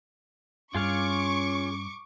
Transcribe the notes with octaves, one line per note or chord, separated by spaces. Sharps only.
G2 C#4 F4 G#4 F5 C#6 D6